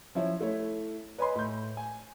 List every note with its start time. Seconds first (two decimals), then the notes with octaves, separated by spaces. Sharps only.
0.15 F3 C#4 E4 C#5
0.40 A3 E4 C#5
1.18 B4 C#5 D#5 G#5 B5 C6
1.35 A2 G6
1.77 G#5